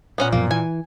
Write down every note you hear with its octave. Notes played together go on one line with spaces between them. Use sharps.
A#2 B3 C#4 F#5
F#2 B2 F3 A#3
E3 G#5